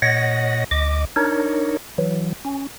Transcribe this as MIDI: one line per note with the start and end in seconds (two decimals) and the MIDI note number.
0.02 0.64 46
0.02 0.64 73
0.02 0.64 75
0.02 0.64 78
0.02 0.64 94
0.71 1.05 38
0.71 1.05 75
0.71 1.05 86
1.16 1.77 62
1.16 1.77 63
1.16 1.77 70
1.16 1.77 73
1.98 2.33 52
1.98 2.33 54
2.45 2.67 61